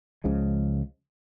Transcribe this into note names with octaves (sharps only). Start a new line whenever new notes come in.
C#2 C#3 F3 G#3